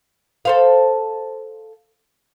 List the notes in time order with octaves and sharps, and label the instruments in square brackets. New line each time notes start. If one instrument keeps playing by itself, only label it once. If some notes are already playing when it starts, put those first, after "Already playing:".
[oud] A4 C5 F5